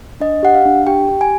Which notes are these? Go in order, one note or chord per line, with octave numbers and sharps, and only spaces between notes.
D4 D#5
G4 F#5
F5
D4
G4 G5
G4
G#5